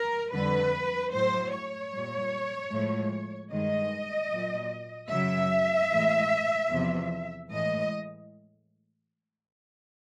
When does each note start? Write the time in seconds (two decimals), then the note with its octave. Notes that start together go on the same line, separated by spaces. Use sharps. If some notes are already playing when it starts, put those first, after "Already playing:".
Already playing: A#4
0.33 F2 D3 G3 B4
1.12 A2 F#3 C5
1.52 C#5
1.92 A#2 G3
2.72 A2 F3 G#3
3.51 G2 D#3 G#3 D#5
4.32 A#2 F#3
5.11 F#2 C#3 F#3 E5
5.91 A2 E3 G#3
6.70 E2 C3 F3
7.50 A2 E3 G#3 D#5